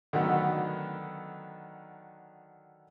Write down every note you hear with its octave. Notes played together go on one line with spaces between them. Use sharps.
D3 D#3 F#3 A3 B3